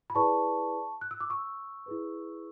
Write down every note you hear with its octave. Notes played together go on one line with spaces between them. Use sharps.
B5
E4 G#4 B4 D5 A5 C#6
F#6
E6
D6
C#6 E6
E4 G#4 B4